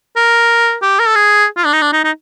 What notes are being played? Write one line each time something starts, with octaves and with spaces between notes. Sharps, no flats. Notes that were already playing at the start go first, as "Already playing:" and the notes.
A#4
G4
A#4
A4
G#4
F4
D4
D#4
D4
D#4
D#4